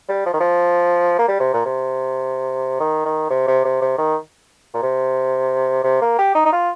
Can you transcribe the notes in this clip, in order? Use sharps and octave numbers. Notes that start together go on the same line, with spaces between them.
G3
F3
D#3
F3
A#3
G3
C3
A#2
C3
D#3
D#3
C3
C3
C3
C3
D#3
A#2
C3
C3
A#3
G4
D#4
D#4
F4